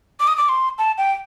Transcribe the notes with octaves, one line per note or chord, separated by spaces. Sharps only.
D6
D#6
D6
C6
A5
G5